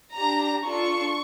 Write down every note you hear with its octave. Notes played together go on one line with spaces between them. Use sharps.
D4 G4 A#5
D4 F4 A4 C#6